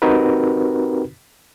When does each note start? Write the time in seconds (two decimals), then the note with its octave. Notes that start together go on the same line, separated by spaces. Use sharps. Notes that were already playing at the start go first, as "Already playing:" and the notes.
0.02 C4 D#4 F#4 G4 A#4 B4